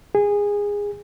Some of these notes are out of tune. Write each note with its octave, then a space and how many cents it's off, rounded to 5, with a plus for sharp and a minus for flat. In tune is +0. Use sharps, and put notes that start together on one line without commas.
G#4 -20